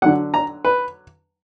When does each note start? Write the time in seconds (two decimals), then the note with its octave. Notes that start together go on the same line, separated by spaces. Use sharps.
0.02 D3 F#3 F#5
0.34 A#5
0.65 B4